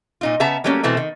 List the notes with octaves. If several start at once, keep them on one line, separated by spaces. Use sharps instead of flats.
A#2 D#4 F4
C#3 B3 E5 A5 A#5
F#3 G3 A3 A#3 C#4
B2 E3 A3 C4
D#3